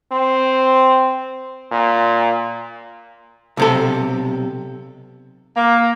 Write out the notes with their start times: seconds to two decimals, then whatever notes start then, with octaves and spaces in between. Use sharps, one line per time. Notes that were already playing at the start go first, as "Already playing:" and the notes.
0.12 C4
1.72 A#2
3.57 B1 C3 A4
5.56 A#3